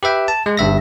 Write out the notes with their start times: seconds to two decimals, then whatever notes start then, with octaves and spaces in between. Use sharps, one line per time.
0.03 G4 B4 E5 G5
0.28 A5
0.46 G#3
0.57 G1 G2 E5 A#6